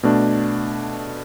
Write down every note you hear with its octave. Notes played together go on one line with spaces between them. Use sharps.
B2 A3 D4